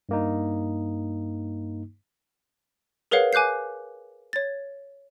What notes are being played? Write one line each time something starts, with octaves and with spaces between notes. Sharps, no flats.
G2 A#3 D#4
G#4 A#4 B4 C#5 F5 F#5
G#5 D6 F#6 G6 C7
C#5 A6